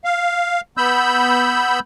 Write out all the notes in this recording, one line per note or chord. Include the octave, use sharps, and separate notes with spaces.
F5
B3 B5 E6 G6